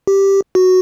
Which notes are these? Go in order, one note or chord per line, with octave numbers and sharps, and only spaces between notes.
G4
F#4